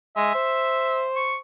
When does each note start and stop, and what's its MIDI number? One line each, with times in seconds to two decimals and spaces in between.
0.17 0.32 56
0.17 1.07 76
0.35 1.39 72
1.15 1.37 85